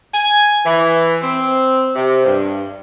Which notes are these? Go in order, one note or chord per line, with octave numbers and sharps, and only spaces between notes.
G#5
E3
C4
C3
G2